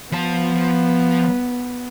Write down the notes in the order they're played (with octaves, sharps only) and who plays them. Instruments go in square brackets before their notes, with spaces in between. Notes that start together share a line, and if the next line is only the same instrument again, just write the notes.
[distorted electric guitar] F3 A5 [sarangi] B3